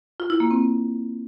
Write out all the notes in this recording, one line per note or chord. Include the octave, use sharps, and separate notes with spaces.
F4
E4
A#3
C4